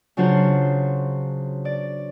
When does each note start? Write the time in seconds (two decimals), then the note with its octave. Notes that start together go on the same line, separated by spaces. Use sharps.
0.17 C#3 F#3 D4 F4 F#4 C5
1.65 D5